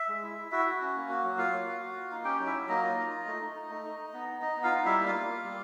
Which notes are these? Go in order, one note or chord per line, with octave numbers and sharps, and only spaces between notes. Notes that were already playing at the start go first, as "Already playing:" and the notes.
Already playing: E5
G#3
E4
E4
E4 F#4 E5
F#4
C#4
A#3
F#4
F#3
A#3 F4 F5
A#3
F#4
F#4
A#3
D#4
C#4 G4 G5
F#3
E4 E5
F#3
A#3 D#4 D#5
F4
F4
D#4
A3
D#4
D#4
A3
D#4
D#4
B3
D#4
D#4 D#5
B3
F4 F5
D#4
G3 E4 E5
A#3
F4 F5
A#3
A#3
G3